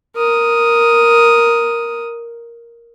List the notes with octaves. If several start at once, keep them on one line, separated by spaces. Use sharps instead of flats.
A#4 D#6